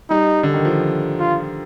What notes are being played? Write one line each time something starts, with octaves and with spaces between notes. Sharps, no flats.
G3 D#4
D3
D#3
F3
F4